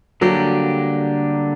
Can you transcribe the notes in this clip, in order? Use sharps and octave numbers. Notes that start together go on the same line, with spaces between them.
D3 F#3 G3 A#3 D4 G4